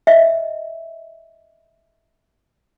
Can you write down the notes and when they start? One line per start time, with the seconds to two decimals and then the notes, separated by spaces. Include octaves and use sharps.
0.07 D#5 E5